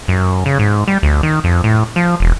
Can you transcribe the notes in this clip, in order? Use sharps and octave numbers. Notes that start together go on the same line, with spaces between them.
F#2
C#3
G#2
G3
D2
D#3
F2
A2
F3
E1